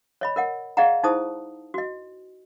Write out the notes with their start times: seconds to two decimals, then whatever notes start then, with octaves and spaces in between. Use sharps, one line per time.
0.21 C#5 D#5 B5
0.36 A#4 D#5 F#5
0.77 G#4 D5 D#5 F5 F#5 A#5
1.03 D#4 E4 G#4 C5 A5 D#6
1.74 F#4 D#5